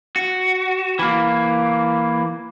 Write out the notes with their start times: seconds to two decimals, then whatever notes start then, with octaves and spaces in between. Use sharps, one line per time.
0.16 F#4
0.99 E3 A#3